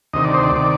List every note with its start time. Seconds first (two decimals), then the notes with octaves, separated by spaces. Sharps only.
0.13 D2 C3 D#3 D#5
0.24 D5
0.34 C5
0.44 D5
0.56 C3 D#3